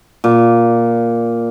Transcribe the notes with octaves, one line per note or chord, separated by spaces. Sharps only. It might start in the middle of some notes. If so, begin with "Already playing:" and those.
A#2